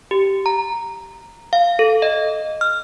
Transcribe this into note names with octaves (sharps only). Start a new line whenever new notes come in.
G4
A#5
F5
A4
D#5
F6